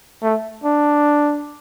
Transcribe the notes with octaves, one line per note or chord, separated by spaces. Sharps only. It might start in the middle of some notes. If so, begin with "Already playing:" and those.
A3
D4